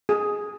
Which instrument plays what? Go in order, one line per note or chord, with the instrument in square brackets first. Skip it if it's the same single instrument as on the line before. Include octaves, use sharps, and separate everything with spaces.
[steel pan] G#4